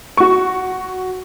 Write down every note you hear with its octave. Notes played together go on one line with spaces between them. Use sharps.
F#4 C#6